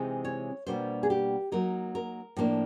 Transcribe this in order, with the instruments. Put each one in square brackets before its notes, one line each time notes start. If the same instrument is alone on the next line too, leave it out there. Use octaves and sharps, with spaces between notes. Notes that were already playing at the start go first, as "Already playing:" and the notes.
Already playing: [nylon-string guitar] C3 E3 G#3 C4 D#4
C#5
B2 G3 A#3 D4 F4 C5
G#4
G4
F#3 A#3 D#4 A#4
A#4
A2 F3 A#3 D4